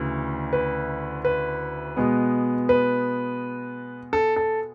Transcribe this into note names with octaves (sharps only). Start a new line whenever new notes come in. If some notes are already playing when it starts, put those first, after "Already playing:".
Already playing: D2 C#3 E3 A3
B4
B4
B2 G#3 B3
B4
A4
A4